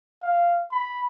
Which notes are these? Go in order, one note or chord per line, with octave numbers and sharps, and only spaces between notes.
F5
B5